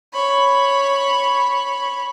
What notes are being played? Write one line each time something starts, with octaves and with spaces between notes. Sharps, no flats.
C#5 B5